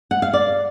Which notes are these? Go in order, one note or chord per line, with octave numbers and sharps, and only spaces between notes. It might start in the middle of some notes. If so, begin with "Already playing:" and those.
F#5
F5
D5